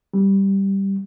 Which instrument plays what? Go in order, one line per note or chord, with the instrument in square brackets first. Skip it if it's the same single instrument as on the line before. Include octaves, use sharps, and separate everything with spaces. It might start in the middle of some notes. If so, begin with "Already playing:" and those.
[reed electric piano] G3